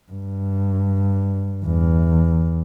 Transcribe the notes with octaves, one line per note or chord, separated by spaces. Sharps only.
G2
E2